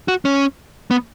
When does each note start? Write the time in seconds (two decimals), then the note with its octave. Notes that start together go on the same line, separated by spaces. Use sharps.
0.08 F#4
0.25 C#4
0.91 B3